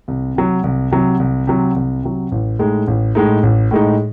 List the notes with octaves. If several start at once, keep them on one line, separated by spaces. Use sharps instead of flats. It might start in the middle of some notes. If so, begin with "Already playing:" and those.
C2
C3 F#3
C2
C3 F#3
C2
C3 F#3
C2
C3 F#3
A1
A2 G#3 D#4
A1
A2 G#3 D#4
A1
A2 G#3 D#4